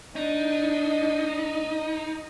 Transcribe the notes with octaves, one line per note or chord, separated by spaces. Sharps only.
D4 D#4 D#5